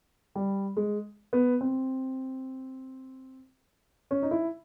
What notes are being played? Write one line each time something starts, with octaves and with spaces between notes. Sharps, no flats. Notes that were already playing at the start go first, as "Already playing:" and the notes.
G3
G#3
B3
C4
C#4
D#4
E4